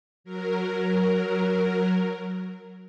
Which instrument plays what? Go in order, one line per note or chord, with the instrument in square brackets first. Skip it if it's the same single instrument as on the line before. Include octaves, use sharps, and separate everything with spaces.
[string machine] F#3 A#4